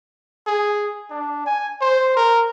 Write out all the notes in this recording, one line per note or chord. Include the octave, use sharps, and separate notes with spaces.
G#4
D4
G#5
C5
A#4